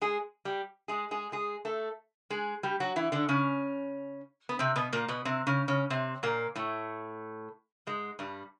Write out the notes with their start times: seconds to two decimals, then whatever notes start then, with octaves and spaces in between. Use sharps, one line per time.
0.01 G#3 G#4
0.45 G3 G4
0.88 G#3 G#4
1.11 G#3 G#4
1.32 G#3 G#4
1.65 A3 A4
2.30 G#3 G#4
2.63 G3 G4
2.80 F#3 F#4
2.96 E3 E4
3.12 D3 D4
3.29 C#3 C#4
4.49 B3
4.59 C3 C4
4.76 B2 B3
4.93 A#2 A#3
5.08 B2 B3
5.25 C3 C4
5.47 C#3 C#4
5.68 C#3 C#4
5.90 C3 C4
6.23 A#2 A#3
6.56 A2 A3
7.87 G#2 G#3
8.19 G2 G3